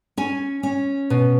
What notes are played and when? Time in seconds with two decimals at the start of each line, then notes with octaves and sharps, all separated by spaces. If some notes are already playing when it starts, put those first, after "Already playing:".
0.17 C#4 G#5
0.63 C#4
1.10 B2